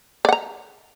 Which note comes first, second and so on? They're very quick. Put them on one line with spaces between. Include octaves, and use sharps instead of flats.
D5 F#5 A#5